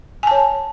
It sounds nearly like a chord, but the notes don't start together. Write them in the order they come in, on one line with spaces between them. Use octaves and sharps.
G#5 A5 C#5